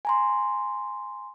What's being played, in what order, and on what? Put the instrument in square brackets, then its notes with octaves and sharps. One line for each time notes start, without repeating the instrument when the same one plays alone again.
[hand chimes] G#5 A#5 C6